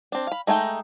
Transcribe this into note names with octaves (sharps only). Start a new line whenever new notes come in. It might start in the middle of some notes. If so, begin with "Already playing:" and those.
C4 D4
F5 B5
G#3 A3 D#4 G5